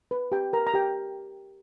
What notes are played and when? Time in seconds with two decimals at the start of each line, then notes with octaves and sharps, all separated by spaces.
0.11 B4
0.32 G4 G5
0.53 A#4 A#5
0.67 A#5
0.74 G4 G5